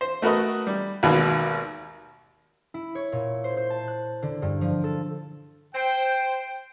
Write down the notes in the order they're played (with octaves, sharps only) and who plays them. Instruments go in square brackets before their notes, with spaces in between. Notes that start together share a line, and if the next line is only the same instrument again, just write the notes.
[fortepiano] C5
A3 F#4 A#4 B4 D#5
G3
G#1 D#2 B2 B5
[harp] E4
C#5
A#2
C5
C5
A5
F#6
D3
G2
F3
A4
[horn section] C5 G5